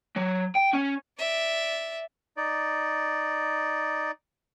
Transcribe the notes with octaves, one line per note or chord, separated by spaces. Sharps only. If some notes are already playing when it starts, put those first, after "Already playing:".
F#3
G5
C#4
D5 E5
D#4 D5